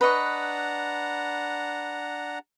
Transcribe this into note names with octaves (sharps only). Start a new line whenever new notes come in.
D4 B4 D#5 F#5 A#5 C#6